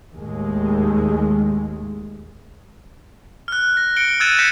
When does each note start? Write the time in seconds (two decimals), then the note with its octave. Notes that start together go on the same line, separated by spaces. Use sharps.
0.14 D#2 A2 G#3
3.48 F6 F#6
3.77 A#6
3.97 C#7 D7 G7
4.20 E6 F#6 G#6 A6 D#7 E7
4.39 G6 G#6 A#6 B6 C#7 E7